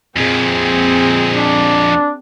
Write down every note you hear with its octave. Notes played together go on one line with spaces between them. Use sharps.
F2 A#2 C4 G#4
D4